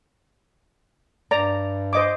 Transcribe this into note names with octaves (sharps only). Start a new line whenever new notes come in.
G2 D5 A#5
C5 D#5 D6